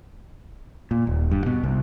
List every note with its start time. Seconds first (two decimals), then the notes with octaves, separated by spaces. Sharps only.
0.91 A#2
1.07 D#1
1.31 G2
1.46 B2
1.64 C2